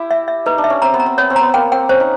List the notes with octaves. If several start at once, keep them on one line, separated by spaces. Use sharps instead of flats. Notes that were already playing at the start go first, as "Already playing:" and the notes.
Already playing: E4 G4
E5
E5
D#4 B4
D4
E5
C#4
C4 A#5
B3
A#5
C4
B3 C#5
C4
A#5
B3
A#3 G5
C4 G5
C#4 C5
D#4